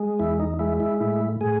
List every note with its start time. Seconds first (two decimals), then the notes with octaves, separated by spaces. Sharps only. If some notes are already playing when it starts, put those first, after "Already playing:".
Already playing: G#3
0.19 E2 E4
0.40 D#4
0.59 G#3 E4
0.80 E4
1.00 A2 E4
1.41 A2 G#4